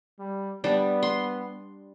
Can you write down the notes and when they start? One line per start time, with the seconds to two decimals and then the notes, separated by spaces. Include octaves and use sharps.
0.19 G3
0.64 G3 B3 D4
1.03 C6